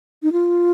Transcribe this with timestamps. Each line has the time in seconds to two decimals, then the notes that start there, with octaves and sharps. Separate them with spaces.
0.23 D#4
0.32 F4